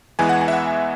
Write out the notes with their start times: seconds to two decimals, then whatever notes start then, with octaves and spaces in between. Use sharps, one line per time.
0.19 E2 E3 G#3 B3 E4 G#5
0.29 F#5
0.41 G#5
0.48 E5
0.53 F#5